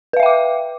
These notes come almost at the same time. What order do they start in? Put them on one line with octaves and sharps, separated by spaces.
B4 F5 E5 G5 D6